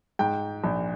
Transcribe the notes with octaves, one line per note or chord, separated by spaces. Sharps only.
G#2 G5
A#1